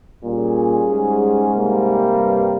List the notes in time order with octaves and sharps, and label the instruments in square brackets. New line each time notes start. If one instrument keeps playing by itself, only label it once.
[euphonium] A#2 [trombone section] G3 C#4 G#4
[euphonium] G#2
[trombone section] C3 G3 A#3
[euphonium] G2